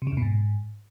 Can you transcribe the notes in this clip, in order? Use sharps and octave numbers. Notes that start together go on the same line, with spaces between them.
C3
C#3
E2
B2
G#2